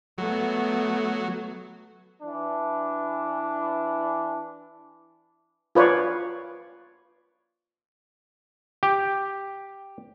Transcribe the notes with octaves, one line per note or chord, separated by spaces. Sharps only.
F#3 A3 B3
E3 D4
F4 B4 C#5 D5
G4